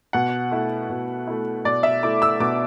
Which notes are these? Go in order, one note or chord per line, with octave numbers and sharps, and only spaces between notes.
B2 F#5
A3 E4
B2
A3 E4
B2 D5
E5
A3 E4 D6
E6
B2 D6